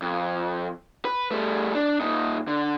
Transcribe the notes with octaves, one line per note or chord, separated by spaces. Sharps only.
F2
B4
G3 A3
D4
A#2 D#4
D3